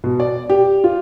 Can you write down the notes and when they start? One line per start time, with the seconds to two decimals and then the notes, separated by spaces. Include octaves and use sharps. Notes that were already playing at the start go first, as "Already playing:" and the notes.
0.04 B2
0.20 D5
0.50 G4
0.84 F4